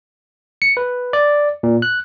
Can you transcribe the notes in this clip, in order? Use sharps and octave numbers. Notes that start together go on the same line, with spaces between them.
C#7
B4
D5
A#2
F#6